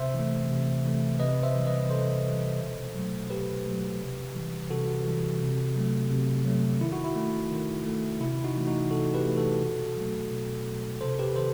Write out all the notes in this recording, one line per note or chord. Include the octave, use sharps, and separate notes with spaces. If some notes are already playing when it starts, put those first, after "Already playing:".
Already playing: C3 C5 E5
E3 A3
C3
E3 A3
C3 B4 D#5
C5 E5
E3 G3
B4 D#5
C3 A4 C5
E3 G3
B2
F#3 A3
B2 G4 B4
F#3 A3
C3
E3 G3
C3 F#4 A4
E3 G3
C3
F#3 A3
C3
F#3 A3
D#3 E4
F#4
E4
A3
D#3
A3
C3 E4
D#4 F#4
E3 A3
D#4 F#4
C3 F#4 A4
G4 B4
E3 A3
F#4 A4
B2
F#3 A3
B2
F#3 A3
C3 A4 C5
G4 B4
D#3 A4 C5